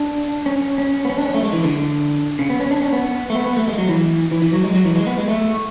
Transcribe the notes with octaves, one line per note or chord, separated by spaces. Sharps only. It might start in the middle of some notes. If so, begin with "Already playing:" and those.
Already playing: D4
C#4
C#4
B3
C#4
D4
C#4
A3
G#3
E3
D3
C#3
B3
C#4
D4
C#4
B3
A3
B3
B3
A3
G#3
F#3
E3
E3
E3
F#3
G#3
F#3
E3
G#3
B3
G#3
A3